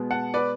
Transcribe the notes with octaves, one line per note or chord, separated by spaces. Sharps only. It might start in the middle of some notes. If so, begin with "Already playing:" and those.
Already playing: B2 G#3 B3
F#5 A5
B4 D5